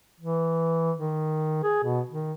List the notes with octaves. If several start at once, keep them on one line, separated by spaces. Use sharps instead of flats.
E3
D#3
G#4
B2
D#3